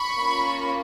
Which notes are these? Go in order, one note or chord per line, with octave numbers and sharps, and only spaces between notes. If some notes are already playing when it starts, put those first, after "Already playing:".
Already playing: B5 C#6
A#3 C#4 F4